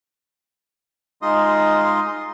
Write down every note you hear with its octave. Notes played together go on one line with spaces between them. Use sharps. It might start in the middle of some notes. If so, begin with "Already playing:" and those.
G#3 D#4 F4 D#5 C6 D#6